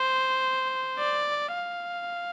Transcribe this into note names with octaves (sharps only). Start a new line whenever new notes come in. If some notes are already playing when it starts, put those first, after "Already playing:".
Already playing: C5
D5
F5